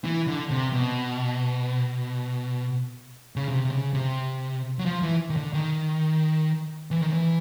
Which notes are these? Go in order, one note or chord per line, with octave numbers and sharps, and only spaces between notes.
E3
D3
C3
B2
C#3
C3
C3
C#3
C3
F#3
F3
E3
D#3
D3
D#3
E3
D#3
E3